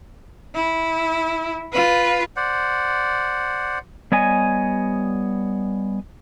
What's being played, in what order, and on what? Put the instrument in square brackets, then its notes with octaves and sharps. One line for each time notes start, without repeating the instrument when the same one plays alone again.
[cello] E4
F4 B4
[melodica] C5 D5 F#5
[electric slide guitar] G3 B3 C#5 D#5 G#5